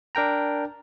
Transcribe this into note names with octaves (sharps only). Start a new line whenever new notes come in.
D4 A#4 G5 A#5